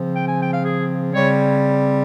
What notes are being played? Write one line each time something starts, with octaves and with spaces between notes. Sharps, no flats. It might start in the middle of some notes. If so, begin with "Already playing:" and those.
Already playing: C#3 F3 C4
G5
G#5
G5
F5
G#4
C#3 G3 C4 C#5